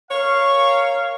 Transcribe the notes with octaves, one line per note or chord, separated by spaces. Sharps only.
A#4 C#5 F5 C#6